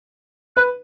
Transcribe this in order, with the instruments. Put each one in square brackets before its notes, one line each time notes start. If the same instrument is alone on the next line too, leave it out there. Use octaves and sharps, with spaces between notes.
[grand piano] B4 [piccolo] F#6